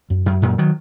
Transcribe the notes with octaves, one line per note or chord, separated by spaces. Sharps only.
F#2
F#2
F#2 A#2
D#3 F#3